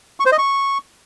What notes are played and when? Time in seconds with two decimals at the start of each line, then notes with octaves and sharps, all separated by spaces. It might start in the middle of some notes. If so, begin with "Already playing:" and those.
0.20 C#6
0.26 C5
0.32 D#5
0.38 C#6